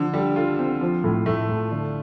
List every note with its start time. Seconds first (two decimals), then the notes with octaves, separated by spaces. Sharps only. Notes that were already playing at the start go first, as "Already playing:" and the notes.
Already playing: D3 F3
0.13 G3 A4
0.36 F4 A4
0.59 C4
0.81 F3
1.04 A2
1.26 A2 A3
1.49 A2
1.71 D3